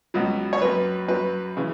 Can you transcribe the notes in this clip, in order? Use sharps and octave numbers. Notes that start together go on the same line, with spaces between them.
C#2 B2 F#3
C#5
F#2 F#3 B4
F#2 F#3 B4
C#3 E3